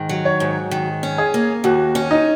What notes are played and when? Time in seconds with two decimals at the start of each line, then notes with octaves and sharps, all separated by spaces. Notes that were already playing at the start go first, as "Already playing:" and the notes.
Already playing: G#2 D#3
0.09 F#3
0.25 C#5
0.40 G#2
0.71 D#3
1.03 C#4
1.18 G#4
1.34 A#3
1.64 D#2 F#4
1.95 C#4
2.11 D#4